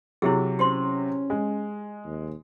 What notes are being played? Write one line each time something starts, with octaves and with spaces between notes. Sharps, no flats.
C3 F#3 E4 G4 G#4
C#4 G4 C5 C6
G#3
D#2